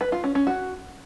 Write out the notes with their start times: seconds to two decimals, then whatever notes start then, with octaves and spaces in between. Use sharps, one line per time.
0.01 B4
0.12 F4
0.24 C#4
0.35 C#4
0.47 F#4